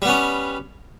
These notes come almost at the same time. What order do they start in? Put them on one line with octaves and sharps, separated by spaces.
G3 B3 C#4